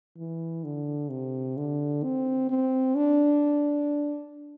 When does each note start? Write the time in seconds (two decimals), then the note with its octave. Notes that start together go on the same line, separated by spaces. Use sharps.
0.18 E3
0.64 D3
1.10 C3
1.57 D3
2.03 C4
2.50 C4
2.95 D4